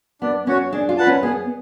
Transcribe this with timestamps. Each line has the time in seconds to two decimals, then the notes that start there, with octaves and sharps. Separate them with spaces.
0.21 B3 D4
0.47 C#4 F#4 C#5
0.72 D4 G#4
0.89 F4
0.97 B4 F#5 A5
1.07 C#4
1.22 B3 G#4